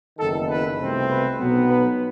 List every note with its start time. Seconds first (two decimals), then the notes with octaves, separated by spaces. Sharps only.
0.18 F#1 E2 D#3 A4
0.48 B4
0.79 C2 B2 A3 C4
1.08 B4
1.39 B1 B2 F#3 B3
1.69 B4